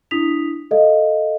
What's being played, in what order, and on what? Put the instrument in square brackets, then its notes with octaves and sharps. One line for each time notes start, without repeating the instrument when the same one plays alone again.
[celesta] D4 E4 D#6 B6 F7
A4 D#5 F5